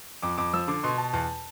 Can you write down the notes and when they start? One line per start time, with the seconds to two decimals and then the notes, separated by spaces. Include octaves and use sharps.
0.22 F2 D6
0.38 F2 D6
0.53 F3 E6
0.68 D3 D6
0.83 B2 C6
0.98 B2 A5
1.13 E2 A5